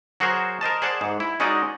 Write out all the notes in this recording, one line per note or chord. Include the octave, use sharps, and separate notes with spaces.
F#3 F#4 G#4 A#4 C5
A#4 C5 D#5 A5
G#4 C5 D5 F#5 A5
G#2
E4
G#3 C#4 D#4 F#4 D5 D#5